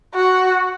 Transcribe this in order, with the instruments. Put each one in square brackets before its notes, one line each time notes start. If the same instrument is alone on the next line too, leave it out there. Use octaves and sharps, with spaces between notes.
[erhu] F#4